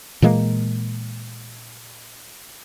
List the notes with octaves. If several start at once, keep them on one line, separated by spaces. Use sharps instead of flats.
A#2 E3 G#3 A#3